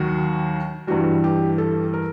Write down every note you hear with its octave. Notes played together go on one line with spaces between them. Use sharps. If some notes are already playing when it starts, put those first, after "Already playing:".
Already playing: D#2 D#3 F#3 F#4
G2 E3 G3 F#4
G4
A4
A#4